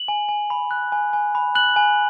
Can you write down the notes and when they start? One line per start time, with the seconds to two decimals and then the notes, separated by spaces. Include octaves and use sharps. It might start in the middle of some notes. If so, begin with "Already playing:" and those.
Already playing: F#7
0.08 G#5
0.29 G#5
0.50 B5
0.71 F#6
0.92 G#5
1.13 G#5
1.35 B5
1.55 F#6 F#7
1.76 G#5